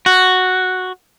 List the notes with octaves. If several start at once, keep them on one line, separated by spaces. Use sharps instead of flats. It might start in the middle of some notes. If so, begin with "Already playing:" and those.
F#4